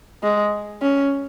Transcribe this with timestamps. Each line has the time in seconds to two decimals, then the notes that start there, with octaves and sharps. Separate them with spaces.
0.23 G#3
0.82 C#4